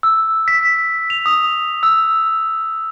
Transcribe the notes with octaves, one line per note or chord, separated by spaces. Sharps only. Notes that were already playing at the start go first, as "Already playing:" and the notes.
E6
B6
F7
D#6
E6